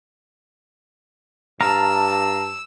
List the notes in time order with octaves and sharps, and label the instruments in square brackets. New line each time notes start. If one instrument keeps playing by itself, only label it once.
[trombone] G2 [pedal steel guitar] F5 A#5 [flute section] A5 [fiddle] E6